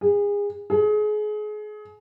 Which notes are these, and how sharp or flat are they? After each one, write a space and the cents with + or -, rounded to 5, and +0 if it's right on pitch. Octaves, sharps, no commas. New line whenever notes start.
G#4 -30
G#4 +30